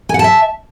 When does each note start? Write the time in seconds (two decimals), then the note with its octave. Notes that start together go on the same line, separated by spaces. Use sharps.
0.09 G#5
0.14 F#5
0.19 A5
0.24 E5